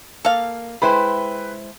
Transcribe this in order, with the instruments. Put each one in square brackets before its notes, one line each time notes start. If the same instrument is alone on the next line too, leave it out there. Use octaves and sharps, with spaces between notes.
[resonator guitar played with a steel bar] A#3 [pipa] A4 F5
[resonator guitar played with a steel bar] G#3 E4 C5 [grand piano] B4 G5 B5